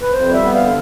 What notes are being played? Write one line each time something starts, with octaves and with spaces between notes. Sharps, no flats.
B4
F2 C5
G3 E5
B3
D3 F5